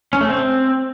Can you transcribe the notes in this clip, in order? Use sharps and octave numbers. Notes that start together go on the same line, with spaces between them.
C#4
A3
C4